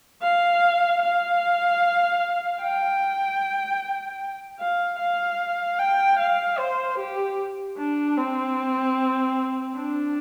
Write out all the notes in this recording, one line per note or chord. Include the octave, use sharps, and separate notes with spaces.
F5
F5
G5
F5
F5
G5
F5
C5
G4
D4
C4
D4